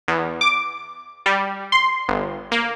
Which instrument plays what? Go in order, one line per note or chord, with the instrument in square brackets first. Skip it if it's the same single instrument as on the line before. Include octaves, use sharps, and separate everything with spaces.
[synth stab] E2
D6
G3
C6
G1
A#3